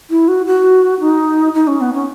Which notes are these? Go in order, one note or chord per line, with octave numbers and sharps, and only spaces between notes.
E4
F#4
F#4
D#4
D#4
C#4
B3
C#4